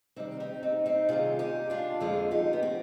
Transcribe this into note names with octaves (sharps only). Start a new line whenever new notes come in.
C3 D#3 G3 C4 D#4
D#4 G4
C4 D#4
C4 D#4
C3 D#3 G3 F4 G#4
D#4 G4
D4 F4
F2 D3 F3 G#3 F4 G#4
D#4 G4
B3
C4